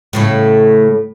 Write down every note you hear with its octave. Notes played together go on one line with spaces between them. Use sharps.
A2 C#3 A3